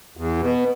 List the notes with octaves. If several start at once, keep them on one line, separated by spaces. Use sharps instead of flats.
E2
B2